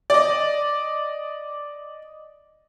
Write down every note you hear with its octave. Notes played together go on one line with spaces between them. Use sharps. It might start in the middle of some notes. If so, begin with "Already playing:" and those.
D5 D#5